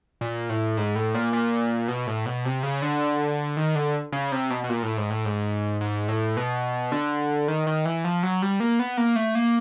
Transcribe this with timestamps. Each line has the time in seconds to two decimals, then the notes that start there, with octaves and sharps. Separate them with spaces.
0.21 A#2
0.49 A2
0.77 G#2
0.96 A2
1.14 A#2
1.33 A#2
1.88 B2
2.07 A2
2.26 B2
2.45 C3
2.63 C#3
2.82 D3
3.57 D#3
3.75 D3
4.12 C#3
4.32 C3
4.50 B2
4.64 B2
4.69 A#2
4.83 A2
4.97 G#2
5.10 A2
5.25 G#2
5.81 G#2
6.08 A2
6.37 B2
6.92 D3
7.48 D#3
7.67 D#3
7.85 E3
8.04 F3
8.23 F#3
8.42 G3
8.60 A#3
8.80 B3
8.97 A#3
9.16 A3
9.35 A#3